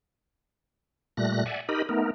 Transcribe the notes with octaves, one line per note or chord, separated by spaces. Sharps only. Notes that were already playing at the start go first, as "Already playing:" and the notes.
A#2 G3 A3 F#6 A#6
D5 E5 F#5 G#5
D#4 G4 A#4 D#5 B5
A3 B3 D#4 A#4